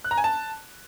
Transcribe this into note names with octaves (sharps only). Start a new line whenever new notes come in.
F#6
A#5
G#5
A5